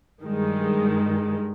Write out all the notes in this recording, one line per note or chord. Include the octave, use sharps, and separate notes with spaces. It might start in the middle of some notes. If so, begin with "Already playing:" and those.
G2 D#3 G#3